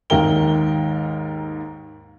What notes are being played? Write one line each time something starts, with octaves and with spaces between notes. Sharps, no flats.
D#2 G#2 A#4 G5 G7